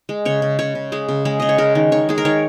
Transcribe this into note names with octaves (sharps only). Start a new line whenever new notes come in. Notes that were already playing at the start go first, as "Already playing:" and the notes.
G#3
C#3 C#5
C#3
C#3 C#5
C#3
G#3 G#4
C#3
G#3 G#4
C#3 D#5
C#5
G#3 A#4
D#3
D#3 C#5
G#3 G#4
A#4
D#3 C#5